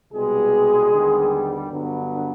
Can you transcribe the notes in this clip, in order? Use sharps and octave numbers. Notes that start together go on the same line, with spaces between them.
C2 B2 G3 G#3 B3 G#4
D#2 D3 G3 B3
G2 D3 F#3 B3